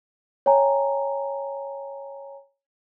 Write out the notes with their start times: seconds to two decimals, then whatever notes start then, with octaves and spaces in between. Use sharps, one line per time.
0.46 C#5 G5 G#5 A#5